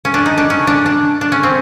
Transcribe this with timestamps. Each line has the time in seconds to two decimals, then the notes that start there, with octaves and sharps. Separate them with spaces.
0.05 C#4
0.14 D4
0.26 D#4
0.38 D4
0.50 C#4
0.67 D4
0.86 D4
1.21 D4
1.32 C#4
1.43 C4